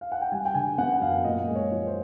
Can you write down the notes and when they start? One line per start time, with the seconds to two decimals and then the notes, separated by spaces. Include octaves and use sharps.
0.01 F5
0.12 F#5
0.22 G5
0.32 G3 G#5
0.45 G5
0.54 D3 G#5
0.78 B3 F#5
1.01 F#2 F5
1.25 A#2 D#5
1.48 G#3
1.55 C#5
1.71 F3
1.87 C5